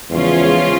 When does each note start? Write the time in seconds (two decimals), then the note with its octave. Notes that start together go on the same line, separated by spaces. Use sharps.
0.10 E2 C#3 F3 G#3 C#4 F4